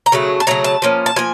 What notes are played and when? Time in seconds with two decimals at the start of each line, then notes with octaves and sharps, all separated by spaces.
0.06 A#5
0.12 C#3 F#3 A3
0.40 A5
0.47 C#3 F#3 A3 A#5
0.64 A5
0.82 F3 A#3 C#4
1.06 A5
1.16 F3 A#3 G#5